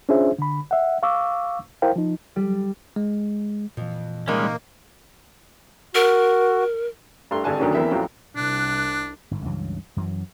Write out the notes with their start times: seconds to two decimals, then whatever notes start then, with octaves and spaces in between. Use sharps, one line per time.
0.09 C#4 D4 F4 G#4 C5 E5
0.38 D3 B5
0.71 E5 F#5
1.03 F5 C#6 D6 E6
1.82 E4 A#4 C5 F5 G5
1.96 F3 D#4
2.36 G3
2.96 G#3
3.77 F2 A#2 E3
4.28 C3 D#3 G3 G#3 A#3 C#4
5.95 F#4 A#4
7.31 G2 A3 A#5 C6
7.44 G#1 G2 D3 G#5 A5 F#6
7.60 D2 D3 D#3 F#3 A#3 C#4
7.75 E2 E3 A#3 C4 A#4 E5
7.91 F2 A2 F#3 C4 C#4
8.36 C2 D4 F#6
9.31 G1 G#2
9.45 C#2 G2 E3 F#3
9.97 F#2 E3 F#3